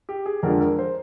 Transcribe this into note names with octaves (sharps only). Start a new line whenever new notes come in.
G4
G#4
F2 D3 F3 G#3 A#4
A#4
C5